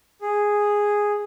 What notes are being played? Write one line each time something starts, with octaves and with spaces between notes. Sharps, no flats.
G#4